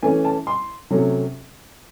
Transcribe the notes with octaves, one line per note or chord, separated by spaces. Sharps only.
E3 A3 C#4 G#5
A5
C6
C3 F#3 A3 C#4